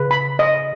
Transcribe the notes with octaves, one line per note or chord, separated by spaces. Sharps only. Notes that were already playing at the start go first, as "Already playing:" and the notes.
Already playing: C#3 B4
B5
D#5